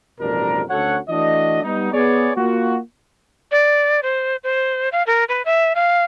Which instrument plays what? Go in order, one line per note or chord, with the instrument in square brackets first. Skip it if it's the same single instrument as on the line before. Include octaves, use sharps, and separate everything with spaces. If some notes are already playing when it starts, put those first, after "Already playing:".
[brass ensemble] A1 F2 B2 G3 D4 A#4
D2 C#4 F#4 A4 C#5 F#5
E3 A3 D4 F#4 D#5
G3 B3 D#4
B3 G#4 C#5 D5
A#3 F4 F#4
[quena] D5
C5
C5
F5
A#4
B4
E5
F5